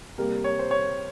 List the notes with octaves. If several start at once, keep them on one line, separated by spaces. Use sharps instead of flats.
C3 G3 A#3 A#4
C#5
C5
C#5